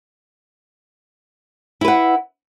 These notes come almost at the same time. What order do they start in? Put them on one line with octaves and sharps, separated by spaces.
E4 B4 F#5